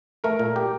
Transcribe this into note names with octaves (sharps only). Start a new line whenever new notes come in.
A3 A#4
A#2
G4